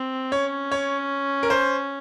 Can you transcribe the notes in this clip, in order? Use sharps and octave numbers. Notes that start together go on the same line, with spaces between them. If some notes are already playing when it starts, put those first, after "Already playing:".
Already playing: C4
C#4 C#5
C#5
A#4
C5